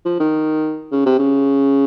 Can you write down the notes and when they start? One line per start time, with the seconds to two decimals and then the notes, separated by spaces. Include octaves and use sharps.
0.05 F3
0.20 D#3
0.92 C#3
1.06 C3
1.19 C#3